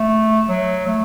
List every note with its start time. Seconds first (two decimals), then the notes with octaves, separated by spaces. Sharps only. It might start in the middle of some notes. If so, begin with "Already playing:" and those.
Already playing: A3
0.49 F#3
0.87 A3